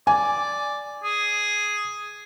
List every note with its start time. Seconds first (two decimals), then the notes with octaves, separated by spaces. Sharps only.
0.07 D5 G#5
1.04 G#4